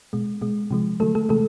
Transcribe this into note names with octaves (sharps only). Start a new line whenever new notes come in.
B2 G#3
B2 G#3
C3 F3 G#3
D3 F#3 A3 A4
A3 A4
C3 E3 G#3 A3 A4